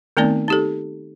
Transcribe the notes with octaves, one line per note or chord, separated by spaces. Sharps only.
D#3 A3 B3 C4 D#4 D5
D#4 G4 A4